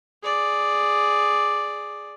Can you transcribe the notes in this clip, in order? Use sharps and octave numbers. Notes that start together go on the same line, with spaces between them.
G#4 D5